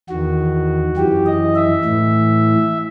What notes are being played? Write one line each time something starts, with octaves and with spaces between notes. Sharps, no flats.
E2 D#3 F#4
F#2 E3 G4
D#5
E5
A2 E3